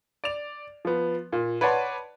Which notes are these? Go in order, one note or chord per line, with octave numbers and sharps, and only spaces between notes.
D5 F7
F3 B3
A#2
B4 C#5 D5 F#5 A5 C6